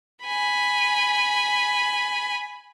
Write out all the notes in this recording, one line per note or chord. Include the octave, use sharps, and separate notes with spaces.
G#5 B5